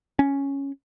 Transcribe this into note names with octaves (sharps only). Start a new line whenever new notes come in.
C#4